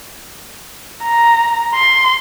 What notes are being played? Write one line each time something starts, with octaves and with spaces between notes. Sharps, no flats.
A#5
C6